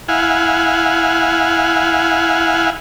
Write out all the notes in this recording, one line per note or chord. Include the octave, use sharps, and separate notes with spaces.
E4 F5 F#5 G#5